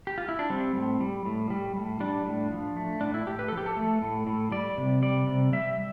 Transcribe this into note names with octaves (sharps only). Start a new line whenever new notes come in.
G4
F4
E4
D4
G3 C4
A2
G3
A2
G3
A2
G3 D4
A2
F3
A3
A2 D4
E4
A2 G4
B4
F3 A4
G4
A4
A3
A2
A2
G3 D5
C3
G3 D5
C3
G3 E5